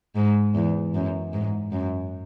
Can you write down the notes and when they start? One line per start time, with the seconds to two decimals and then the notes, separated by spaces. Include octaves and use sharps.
0.16 G#2
0.55 E2
0.94 F#2
1.33 G#2
1.72 F#2